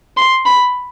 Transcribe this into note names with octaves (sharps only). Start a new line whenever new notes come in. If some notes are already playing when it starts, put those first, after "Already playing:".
C6
B5